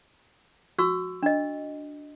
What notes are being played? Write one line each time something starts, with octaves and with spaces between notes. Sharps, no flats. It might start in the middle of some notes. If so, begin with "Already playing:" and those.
F#4 C#6 E6
D4 D#5